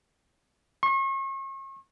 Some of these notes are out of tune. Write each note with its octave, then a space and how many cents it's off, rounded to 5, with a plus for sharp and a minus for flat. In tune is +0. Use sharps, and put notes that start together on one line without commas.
C#6 -40